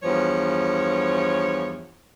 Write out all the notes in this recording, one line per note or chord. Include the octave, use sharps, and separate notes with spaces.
E2 G2 F3 C#5